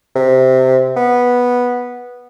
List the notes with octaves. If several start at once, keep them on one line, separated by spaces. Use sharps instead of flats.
C3
B3